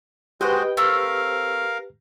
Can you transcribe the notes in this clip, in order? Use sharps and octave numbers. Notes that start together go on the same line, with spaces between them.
G#3 F#4 G4 B4 C5 D#5 G5
A3 C4 A#4 F5